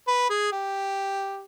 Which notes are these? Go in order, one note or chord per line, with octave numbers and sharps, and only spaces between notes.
B4
G#4
G4